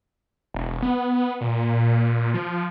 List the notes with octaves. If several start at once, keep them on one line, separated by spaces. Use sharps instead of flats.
E1
B3
A#2
F3